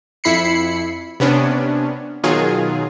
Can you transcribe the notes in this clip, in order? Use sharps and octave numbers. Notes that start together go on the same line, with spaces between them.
F2 E4 B5 C7 C#7
C3 B3 C#4 D4
B2 D#3 F#3 F4 G#4